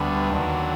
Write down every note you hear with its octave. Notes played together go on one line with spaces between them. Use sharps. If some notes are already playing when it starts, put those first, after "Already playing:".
Already playing: D2 D3 G3 B3
D#2 D3 F#3